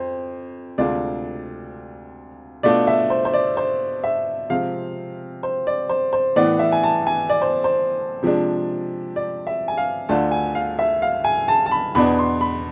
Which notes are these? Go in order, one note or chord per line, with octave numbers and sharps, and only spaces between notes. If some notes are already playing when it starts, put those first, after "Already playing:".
Already playing: F2 C5
D2 C3 G#3 D4 F4 D5
B2 A3 D4 F4 D5
E5
C5
C5
D5
C5
E5
C3 F3 G#3 C4 F5
C5
D5
C5
C5
A2 E3 B3 D5
E5
G#5
A5
G#5
D5
C5
C5
C3 F3 G#3 D4
D5
E5
G#5
F5
D2 D3 A3 D4 F4 A5
G#5
F5
E5
F5
G#5
A5
A5
B5
E2 B2 B3 D4 B5
C6
B5